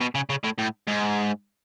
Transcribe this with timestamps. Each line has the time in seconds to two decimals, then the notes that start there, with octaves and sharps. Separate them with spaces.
0.01 B2
0.15 C#3
0.30 C#3
0.44 A2
0.58 A2
0.87 G#2